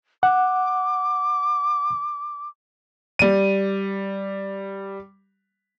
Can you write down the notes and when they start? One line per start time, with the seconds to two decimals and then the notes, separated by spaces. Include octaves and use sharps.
0.23 F#5 D6
3.19 G3 D#7